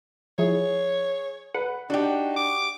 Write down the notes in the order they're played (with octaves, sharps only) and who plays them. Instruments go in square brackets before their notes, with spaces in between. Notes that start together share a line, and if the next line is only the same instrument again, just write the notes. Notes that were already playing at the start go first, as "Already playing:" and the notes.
[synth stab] F3 E4 [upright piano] G#4 [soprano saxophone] C#5
[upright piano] B4 [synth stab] F#5
[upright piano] D4 [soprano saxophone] D#4 [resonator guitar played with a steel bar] F#4 G4
[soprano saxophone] D6